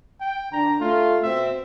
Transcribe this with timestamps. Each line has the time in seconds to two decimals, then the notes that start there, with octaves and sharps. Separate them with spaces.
0.20 G5
0.52 D3 D4 A#5
0.81 A3 F4
1.23 B2 C4 E5